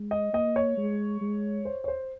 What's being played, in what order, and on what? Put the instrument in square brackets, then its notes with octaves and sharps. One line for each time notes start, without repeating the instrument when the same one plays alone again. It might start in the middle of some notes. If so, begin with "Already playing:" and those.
Already playing: [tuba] G#3
[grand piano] D#5
[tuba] A#3 [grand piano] D#5
[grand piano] C#5
[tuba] G#3
G#3
[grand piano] C5
C#5
C5